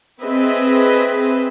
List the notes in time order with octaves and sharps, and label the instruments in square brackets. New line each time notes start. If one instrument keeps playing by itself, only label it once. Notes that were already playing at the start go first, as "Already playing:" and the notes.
[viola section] C4 G#4 B4 D#5 E5